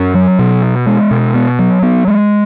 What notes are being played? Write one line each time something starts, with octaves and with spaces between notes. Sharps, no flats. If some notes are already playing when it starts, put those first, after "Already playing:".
Already playing: F#2 C#4
F#3
B2
B3
G#3
B2
B3
F#3
B3
G#3